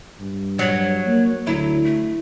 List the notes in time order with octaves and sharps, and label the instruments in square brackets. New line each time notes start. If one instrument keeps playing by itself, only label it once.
[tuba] G2
[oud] F#3 [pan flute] C#5
[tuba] A#3
[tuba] D2 [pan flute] F#3 [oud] E4
[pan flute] A3